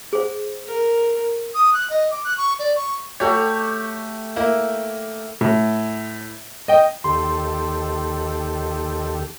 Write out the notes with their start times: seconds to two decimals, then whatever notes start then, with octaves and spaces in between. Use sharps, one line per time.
0.13 G#4 C5
0.67 A#4
1.54 D#6
1.73 F#6
1.90 D#5
2.11 D6
2.25 F#6
2.37 C#6
2.59 D5
2.76 C#6
3.20 A3 F#4 G4 C#5
4.36 A#3 E4
5.41 A2
6.68 D#5 G5
7.04 D#2 G4 A4 C6